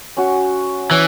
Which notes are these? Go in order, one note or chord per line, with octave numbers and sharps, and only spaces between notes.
C#4 F#4
E3 C#4